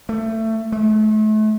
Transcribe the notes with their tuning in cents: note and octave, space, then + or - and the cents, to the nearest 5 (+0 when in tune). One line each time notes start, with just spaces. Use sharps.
A3 +20
A3 -35